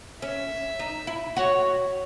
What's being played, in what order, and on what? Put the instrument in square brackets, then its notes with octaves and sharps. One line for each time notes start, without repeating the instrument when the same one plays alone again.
[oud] C#4 [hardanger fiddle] E5
[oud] D#4
E4
[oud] F#4 [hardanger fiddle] C#5